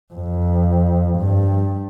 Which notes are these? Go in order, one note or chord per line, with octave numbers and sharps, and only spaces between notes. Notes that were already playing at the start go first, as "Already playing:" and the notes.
F2
G2